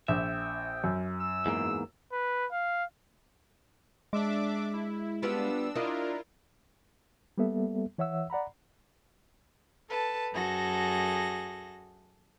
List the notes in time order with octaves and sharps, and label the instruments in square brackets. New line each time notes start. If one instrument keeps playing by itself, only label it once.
[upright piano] A#1 [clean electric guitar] E5 [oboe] G5
[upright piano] F#2
[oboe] E6
[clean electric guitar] E2 G#2 A#3
[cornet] B4
F5
[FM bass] G#3 [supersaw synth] D4 E5 D6
[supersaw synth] E4
[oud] G3 B3 F4 [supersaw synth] D4 E6
[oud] D4 D#5 [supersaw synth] E4 F4 A#4
[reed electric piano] G3 A#3 B3 A4 E5
E3 C#5 E5 F#5 E6
D5 F#5 A#5 B5
[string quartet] A4 B4 A5
F#2 F#4 G#4 A4 A#6